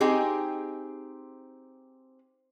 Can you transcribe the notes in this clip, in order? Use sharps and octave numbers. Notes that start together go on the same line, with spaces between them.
C4 D#4 G4 G#4